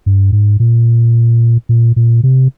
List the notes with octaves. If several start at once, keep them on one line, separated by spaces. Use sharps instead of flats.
G2
G#2
A#2
A#2
A#2
C3